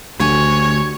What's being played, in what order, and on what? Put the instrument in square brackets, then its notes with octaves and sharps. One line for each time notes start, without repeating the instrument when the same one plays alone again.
[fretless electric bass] D2 [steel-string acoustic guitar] F#4 G4 G#5 [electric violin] C#5